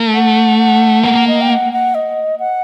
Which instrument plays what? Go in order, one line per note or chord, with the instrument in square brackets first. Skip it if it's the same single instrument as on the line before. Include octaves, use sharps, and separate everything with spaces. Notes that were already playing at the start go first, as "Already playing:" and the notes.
Already playing: [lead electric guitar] A3
[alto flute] F#5
F#5
[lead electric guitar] A#3 [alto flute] F#5
[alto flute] D#5
G5
F#5
F#5
D#5
F#5